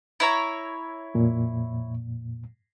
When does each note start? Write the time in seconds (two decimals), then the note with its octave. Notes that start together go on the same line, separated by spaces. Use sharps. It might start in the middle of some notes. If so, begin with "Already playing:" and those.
0.20 E4 C#5 A#5
1.14 F2 A#2